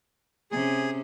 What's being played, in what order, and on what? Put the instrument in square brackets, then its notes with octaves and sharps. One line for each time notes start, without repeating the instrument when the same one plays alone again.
[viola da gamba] C3 C#4 [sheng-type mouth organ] G#4